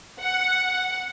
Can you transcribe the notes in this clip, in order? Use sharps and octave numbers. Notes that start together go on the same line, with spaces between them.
F#5